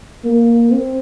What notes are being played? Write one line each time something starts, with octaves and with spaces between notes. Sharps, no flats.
A#3
C4